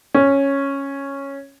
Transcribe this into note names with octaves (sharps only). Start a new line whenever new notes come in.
C#4